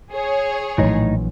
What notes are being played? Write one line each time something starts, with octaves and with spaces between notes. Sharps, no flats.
G#4 C#5
A#1 A2 E3 F#3 D#4